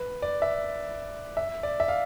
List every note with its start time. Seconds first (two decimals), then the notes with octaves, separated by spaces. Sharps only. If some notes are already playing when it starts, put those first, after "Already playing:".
Already playing: B4
0.22 D5
0.42 E5
1.37 E5
1.63 D5
1.80 E5
1.88 F5